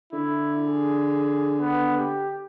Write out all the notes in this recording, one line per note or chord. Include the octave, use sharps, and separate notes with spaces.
D3 E4
G#4
B3
G4